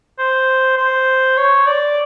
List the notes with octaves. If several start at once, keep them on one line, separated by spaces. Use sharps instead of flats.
C5
C5
C#5
D5